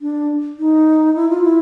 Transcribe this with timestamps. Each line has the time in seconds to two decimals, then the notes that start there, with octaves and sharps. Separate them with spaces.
0.01 D4
0.59 D#4
1.16 E4
1.30 F4
1.43 E4